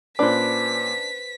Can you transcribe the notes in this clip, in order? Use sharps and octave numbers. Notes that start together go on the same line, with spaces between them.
A#2 C#4 D4 B4 C5 D6 B6